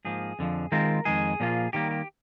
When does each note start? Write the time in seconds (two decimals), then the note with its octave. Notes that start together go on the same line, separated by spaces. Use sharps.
0.05 G#2 F3 A#3 G#4
0.39 F2 D3 F3
0.72 D#3 G#3 C4 F4 A#4
1.05 F2 D#3 G#3 G#4
1.40 A#2 F3 A#3 F4
1.73 D#3 G3 A#3 G4
1.91 G4